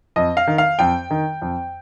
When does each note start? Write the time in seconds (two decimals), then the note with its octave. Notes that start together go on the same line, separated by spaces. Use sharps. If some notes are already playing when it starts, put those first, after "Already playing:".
0.16 F2 D#5
0.37 F5
0.47 D#3
0.58 F5
0.79 F2 G5
1.11 D#3
1.42 F2